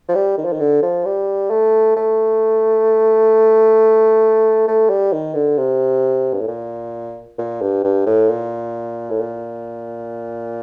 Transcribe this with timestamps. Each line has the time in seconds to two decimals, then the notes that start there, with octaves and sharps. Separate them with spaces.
0.09 F3
0.15 G3
0.38 D#3
0.45 F3
0.53 D#3
0.60 D3
0.83 F3
1.05 G3
1.51 A3
1.97 A3
4.68 A3
4.90 G3
5.13 D#3
5.35 D3
5.58 C3
6.33 G2
6.41 A2
6.48 A#2
7.38 A#2
7.62 G2
7.84 G2
8.06 A2
8.29 A#2
9.10 A2
9.20 A#2